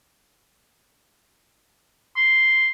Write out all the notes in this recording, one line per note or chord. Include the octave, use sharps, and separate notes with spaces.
C6